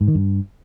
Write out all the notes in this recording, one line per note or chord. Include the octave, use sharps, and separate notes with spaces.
G#2
D#3
G2